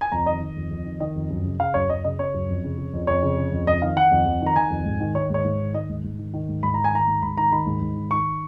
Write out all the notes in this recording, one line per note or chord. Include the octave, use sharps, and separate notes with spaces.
G#5
F2 A#5
D#3 D#5
D#3
F2
F2
D#3
D#3 D#5
F2
F#2
C#3
C#3 F5
F#2 C#5
F#2 D#5
C#3 D#5
C#3 C#5
F#2
F2
C#3
C#3
F2
F2 C#5
C#3
C#3
F2
F2 D#5
D#3 F5
D#3 F#5
F2
F2
D#3
A#5
D#3 G#5
F2
G#2
D#3
D#3 C#5
G#2 C#5
G#2
D#3
D#3 D#5
G#2
G#2
D#3
D#3
G#2
G#2 B5
D#3 A#5
G#5
D#3 A#5
G#2
G#2 B5
D#3 A#5
D#3 B5
G#2
G#2
D#3
D#3 C#6